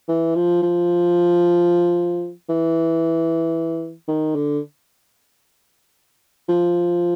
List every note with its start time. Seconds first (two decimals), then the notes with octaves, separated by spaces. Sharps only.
0.08 E3
0.35 F3
0.63 F3
2.49 E3
4.08 D#3
4.36 D3
6.49 F3